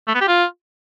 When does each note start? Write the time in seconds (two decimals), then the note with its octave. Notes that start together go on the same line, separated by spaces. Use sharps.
0.08 A3
0.15 B3
0.21 G4
0.28 F4